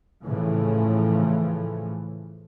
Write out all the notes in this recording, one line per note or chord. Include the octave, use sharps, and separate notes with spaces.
A2 C#3 E3 F3 A3